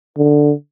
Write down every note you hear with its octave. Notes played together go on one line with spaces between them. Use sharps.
D3